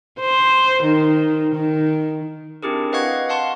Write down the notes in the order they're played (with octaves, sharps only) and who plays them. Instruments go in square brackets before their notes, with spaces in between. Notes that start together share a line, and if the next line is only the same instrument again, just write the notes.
[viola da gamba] C5
D#3
D#3
[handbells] C4 D4 E4 G4 G#4 A#4
B4 D#5 F5 F#5 C#6 G#6
F5 F#5 A5 C6 C#6